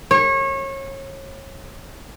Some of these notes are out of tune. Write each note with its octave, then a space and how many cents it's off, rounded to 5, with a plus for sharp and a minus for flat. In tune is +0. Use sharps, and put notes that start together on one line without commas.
C#5 -30